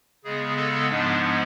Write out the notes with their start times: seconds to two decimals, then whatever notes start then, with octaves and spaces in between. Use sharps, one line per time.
0.24 C#3 G#3 B3 G#4
0.56 A4
0.89 G#2 F3 G#3 B3 D4